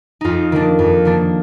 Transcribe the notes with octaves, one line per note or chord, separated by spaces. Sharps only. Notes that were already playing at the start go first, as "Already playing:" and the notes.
F2 D#4 F4
D#3 A#3 D4
F2
D#3 A#3 D4